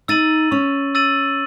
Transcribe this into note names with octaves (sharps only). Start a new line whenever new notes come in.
D#4 E6 A6 D#7 F#7
C#4 C#6
E6 A6 D#7 F#7